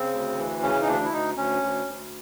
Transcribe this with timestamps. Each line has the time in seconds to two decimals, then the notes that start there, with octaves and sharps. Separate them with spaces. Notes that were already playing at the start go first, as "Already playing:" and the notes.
Already playing: C#3 C4
0.13 D2
0.37 E3
0.62 C#3 C#4
0.82 D#4
0.87 D2 D4
1.05 E4
1.13 D2 D#4
1.37 D2 C#4
1.63 D2
1.87 D2